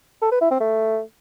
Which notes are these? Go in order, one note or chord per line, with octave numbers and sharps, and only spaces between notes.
A4
B4
E4
C4
A3